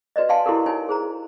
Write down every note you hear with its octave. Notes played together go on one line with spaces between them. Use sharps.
F#4 B4 D5 D#5
D5 F5 F#5 G#5 A5 C6
E4 F#4 G4 A4 A#4
D#4 C#5 G#5
G#4 C5 A#5